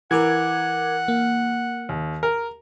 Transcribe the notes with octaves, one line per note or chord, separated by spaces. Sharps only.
E3 A#4 F#5 D6 G#6
A#3
D#2
A#4